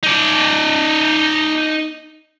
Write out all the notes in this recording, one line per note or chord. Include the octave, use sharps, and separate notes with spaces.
D#4 D5